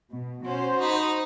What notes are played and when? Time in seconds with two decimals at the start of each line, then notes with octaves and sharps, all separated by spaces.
0.12 B2
0.45 C#4 F#4 C5
0.79 D#4 B5